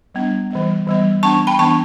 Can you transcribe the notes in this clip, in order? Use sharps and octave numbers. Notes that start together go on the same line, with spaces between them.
G3 B3 D4
E3 G3 B3
E3 G3 B3
E3 B3 D4 A5 C#6
G5 B5
E3 B3 D4 A5 C#6